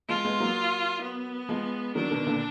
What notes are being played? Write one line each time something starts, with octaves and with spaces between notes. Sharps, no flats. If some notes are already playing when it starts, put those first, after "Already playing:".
F3 G#3 F4
G#3 B3
F#3 A#3
B3
F3 G#3
D#3 F#3 D4
B2 D#3
A#2 D3